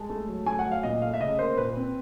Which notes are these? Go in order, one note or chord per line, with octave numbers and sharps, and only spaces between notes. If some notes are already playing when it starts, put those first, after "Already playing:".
Already playing: G#3 A5
A3
F#3
A3 G#5
F#5
F#3
F5
A#2 D#5
A3 F5
E5
C#3 D#5
A#3 C5
A#2 B4
C4